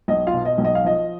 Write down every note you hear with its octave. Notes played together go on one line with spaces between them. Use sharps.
B1 D#5
F4 F5
B2
D#5
B1
D#5
F5
F3 D#5